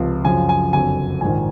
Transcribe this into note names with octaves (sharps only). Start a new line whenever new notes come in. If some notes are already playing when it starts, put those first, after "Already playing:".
Already playing: C#2 C3 F3
F#2 C#3 F3 G#5
G#5
F#1 F2 D3 F#3 G#5
A#1 G#2 D#3 G#5